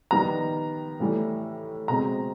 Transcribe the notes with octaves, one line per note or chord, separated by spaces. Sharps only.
D#3 G3 B3 A#5
A2 E3 G3
B2 G#3 C4 A#5